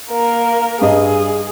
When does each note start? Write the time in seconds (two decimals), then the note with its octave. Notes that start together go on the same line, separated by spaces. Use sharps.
0.10 A#3 A#4
0.81 G2 G#4 D#5